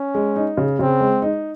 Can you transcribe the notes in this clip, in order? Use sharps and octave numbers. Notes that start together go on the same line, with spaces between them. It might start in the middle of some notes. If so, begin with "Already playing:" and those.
Already playing: C#4
G#3
D#4
C#3
C#3 C4
G#3
D#4